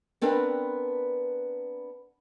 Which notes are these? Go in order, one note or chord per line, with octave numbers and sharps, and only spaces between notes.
B3 C4 D4 A#4 B4